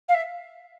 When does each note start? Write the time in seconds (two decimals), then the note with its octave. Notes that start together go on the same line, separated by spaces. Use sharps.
0.08 F5
0.14 E5